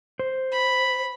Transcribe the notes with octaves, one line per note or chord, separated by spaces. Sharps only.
C5
B5